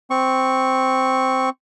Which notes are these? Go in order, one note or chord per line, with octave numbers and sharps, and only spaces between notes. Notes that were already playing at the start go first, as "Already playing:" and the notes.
C4 C#6